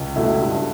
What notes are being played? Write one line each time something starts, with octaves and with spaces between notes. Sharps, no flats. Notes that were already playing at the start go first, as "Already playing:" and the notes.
Already playing: C#2
B2 A3 E4 A4
G2